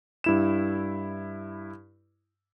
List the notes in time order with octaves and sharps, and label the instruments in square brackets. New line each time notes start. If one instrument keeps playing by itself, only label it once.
[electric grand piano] G2 E4 E7